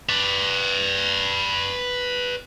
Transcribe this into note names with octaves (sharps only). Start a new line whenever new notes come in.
B4 D5